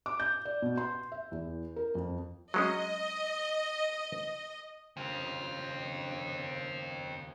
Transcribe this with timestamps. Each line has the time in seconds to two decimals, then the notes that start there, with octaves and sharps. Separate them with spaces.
0.06 D6
0.20 G6
0.45 D5
0.62 B2
0.78 C6
1.12 E5
1.32 E2
1.76 A#4
1.95 F2
2.54 F#3 G#3 C#4 D#5
4.97 D#2 C#3 C4 F4